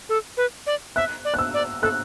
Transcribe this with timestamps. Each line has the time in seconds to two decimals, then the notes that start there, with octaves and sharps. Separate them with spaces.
0.09 A4
0.37 B4
0.67 D5
0.96 E5 F#6
1.25 D5
1.34 F#6
1.39 E6
1.54 D5
1.82 A4 F#6